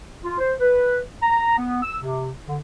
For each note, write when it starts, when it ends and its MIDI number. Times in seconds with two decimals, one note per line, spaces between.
0.24 0.37 65
0.38 0.54 72
0.60 0.98 71
1.23 1.57 82
1.57 1.80 59
1.82 1.96 88
2.01 2.30 48
2.48 2.57 50